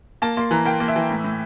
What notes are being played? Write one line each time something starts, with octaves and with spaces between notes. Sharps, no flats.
A#3 A5
A#3 C6
E3 A#5
A#3 G5
A#3
E5
E3
A2
A2